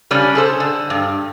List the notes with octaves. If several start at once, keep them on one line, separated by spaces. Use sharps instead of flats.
C#3 G3 C#4 D4
G#4 A4 C5
D3
G2